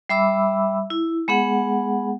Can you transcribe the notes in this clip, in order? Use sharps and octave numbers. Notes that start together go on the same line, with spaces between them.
G3 E5 B5 D6 E6
E4
G#3 B3 G#4 F#5